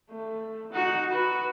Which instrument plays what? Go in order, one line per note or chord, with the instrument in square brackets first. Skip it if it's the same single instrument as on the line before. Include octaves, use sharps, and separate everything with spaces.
[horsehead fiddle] A3
[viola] D#4 F#4 [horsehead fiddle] F#5
[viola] F#4 [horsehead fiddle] B4